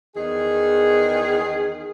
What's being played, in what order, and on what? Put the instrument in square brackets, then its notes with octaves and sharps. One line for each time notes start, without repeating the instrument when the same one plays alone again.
[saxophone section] E2 D#3 G#4